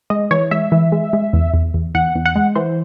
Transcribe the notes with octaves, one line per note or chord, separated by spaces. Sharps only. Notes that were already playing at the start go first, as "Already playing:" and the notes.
G#3 D#5
E3 C#5
G#3 E5
E3
G#3
G#3
E2
E2
E2
E2 F#5
E2
F#5
G#3
E3 C5